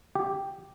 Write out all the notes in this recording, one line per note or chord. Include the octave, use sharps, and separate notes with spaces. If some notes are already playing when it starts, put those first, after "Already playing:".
G4